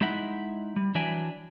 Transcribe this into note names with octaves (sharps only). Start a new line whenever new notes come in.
G#3 D#4 E4 E5 F#5
G3
E3 F#3 D4 E5 G5 G#5